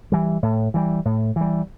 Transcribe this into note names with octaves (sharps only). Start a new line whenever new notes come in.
E3 G3
A2
E3 G3
A2
E3 G3